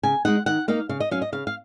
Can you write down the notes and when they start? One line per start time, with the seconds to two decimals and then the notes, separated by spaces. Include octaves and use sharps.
0.03 C#3 G#5
0.25 G#3 D#4 F#5
0.46 D#3 F#5
0.68 A#3 D#4 F5
0.89 C#3 F5
1.00 D#5
1.11 F#3 C#4 F5
1.22 D#5
1.32 C#3 F5
1.47 F5